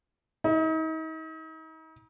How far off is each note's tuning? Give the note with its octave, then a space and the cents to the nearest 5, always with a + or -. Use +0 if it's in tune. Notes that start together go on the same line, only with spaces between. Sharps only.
D#4 +40